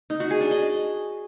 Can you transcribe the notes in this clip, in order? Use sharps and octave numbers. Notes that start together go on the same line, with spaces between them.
D#4
F#4
G#4
D4
D#5